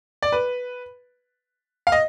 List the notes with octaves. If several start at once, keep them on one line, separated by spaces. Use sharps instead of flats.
D5
B4
F5
D#5